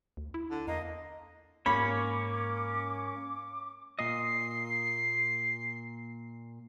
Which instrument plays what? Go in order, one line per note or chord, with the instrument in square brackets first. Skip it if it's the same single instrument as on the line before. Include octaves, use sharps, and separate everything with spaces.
[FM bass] D2
E4
[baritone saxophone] D3
[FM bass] E2 [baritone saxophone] A#3 [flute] D#5
[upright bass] G#2 [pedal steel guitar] A#3 C#4 C#5 [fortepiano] B5 [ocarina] D6
[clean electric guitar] A#2 D#5 [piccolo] C7